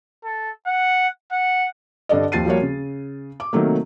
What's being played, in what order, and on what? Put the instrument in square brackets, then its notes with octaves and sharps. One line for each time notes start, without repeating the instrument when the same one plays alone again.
[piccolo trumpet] A4
F#5
F#5
[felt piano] G2 D3 A4 D5 D#5
D#2 F3 A6 C7 D#7
F3 G3 A#3 F#4 C#5
C#3
D6
C3 D#3 F#3 A3 A#3